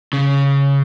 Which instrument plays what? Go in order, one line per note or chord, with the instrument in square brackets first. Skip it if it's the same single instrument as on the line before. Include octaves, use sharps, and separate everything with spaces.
[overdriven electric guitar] C#3